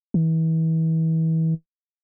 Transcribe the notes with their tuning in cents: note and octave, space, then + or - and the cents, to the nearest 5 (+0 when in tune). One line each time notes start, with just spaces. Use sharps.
E3 -35